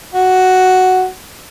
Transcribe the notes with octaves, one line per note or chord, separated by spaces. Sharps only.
F#4